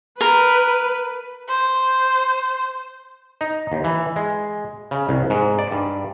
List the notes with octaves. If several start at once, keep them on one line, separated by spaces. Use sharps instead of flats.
A#4 B4
C5
D#4
D#2
E3
G#3
C#3
C2
G#2
D5
G2